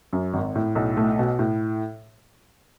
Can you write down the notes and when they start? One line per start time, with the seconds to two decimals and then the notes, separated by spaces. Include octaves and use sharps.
0.13 F#2
0.33 G#1
0.55 A2
0.75 B1
0.97 A3
1.19 B2
1.39 A2